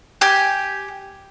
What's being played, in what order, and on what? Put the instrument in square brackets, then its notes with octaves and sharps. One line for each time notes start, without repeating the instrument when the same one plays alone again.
[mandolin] G4 G#5